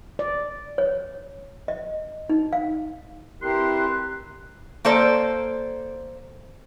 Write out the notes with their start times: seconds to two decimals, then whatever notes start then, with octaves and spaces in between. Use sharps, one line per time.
0.19 D5
0.78 C#5
1.68 D#5
2.29 D#4
2.53 F5
3.42 G2 C4 E4 G4 A#4 C6 F#6
4.85 A#3 A4 C5 D5